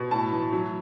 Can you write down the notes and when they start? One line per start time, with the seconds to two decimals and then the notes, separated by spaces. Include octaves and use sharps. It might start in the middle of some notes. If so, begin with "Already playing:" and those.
Already playing: B2
0.11 A2 A5
0.32 E3
0.53 F#3